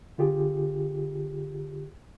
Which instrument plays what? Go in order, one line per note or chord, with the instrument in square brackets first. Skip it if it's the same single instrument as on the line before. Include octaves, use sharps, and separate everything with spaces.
[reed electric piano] D3 F4 G4 G#4